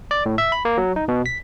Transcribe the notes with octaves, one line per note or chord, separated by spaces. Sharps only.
D5
A2
E5
B5
A#3
F#3
D#4
B2
B6